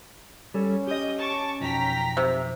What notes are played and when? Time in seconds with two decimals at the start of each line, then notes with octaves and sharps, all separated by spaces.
0.54 G3 C#4 A4
0.87 G4 D#5 D#6 G6
1.18 A5 C#6 D6
1.60 B1 F2 G5 A#5 B6
2.17 C3